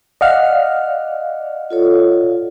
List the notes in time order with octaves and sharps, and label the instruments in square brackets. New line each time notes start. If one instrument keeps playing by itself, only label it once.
[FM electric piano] D5 F5 [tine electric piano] D#5 F#5 F6
[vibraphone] F4 A4 C#5